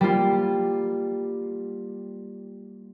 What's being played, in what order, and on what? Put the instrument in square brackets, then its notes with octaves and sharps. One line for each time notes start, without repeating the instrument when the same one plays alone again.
[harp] G3 A#3 F4